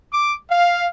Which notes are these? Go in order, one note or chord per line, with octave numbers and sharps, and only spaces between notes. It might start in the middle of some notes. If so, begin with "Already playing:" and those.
D6
F5